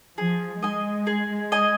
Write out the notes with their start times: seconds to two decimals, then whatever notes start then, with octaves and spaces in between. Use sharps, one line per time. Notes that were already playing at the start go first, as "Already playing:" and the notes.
0.18 F3 G#4
0.63 G#3 D#5 G#5
1.07 G#4
1.52 D#5 G#5